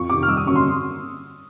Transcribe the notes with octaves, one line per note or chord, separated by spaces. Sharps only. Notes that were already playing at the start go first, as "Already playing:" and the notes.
Already playing: F2 C#6
C3 D#3 D6
F6
G2 E6
D#6
D3 F#3 A#3 C#4 C#6
C6